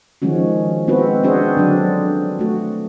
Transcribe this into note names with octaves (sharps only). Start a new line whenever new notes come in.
D#3 F3 G#3 C#4 F#4
G#3 B3 C4 E4 F#4 B4
C4 D4 F#4 G#4 B4 C5
D3 F#3 D4
A3 F#4